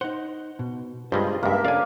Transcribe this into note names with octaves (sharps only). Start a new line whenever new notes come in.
D#4 C5 F#5
B2
G2 G3 G#3 C4 F4 G#4 C5 D#5
C#2 G2 A#3 E5
C#4 D4 A4 D5 F5 G#5